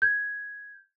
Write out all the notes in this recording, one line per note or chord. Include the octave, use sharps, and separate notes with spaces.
G6 G#6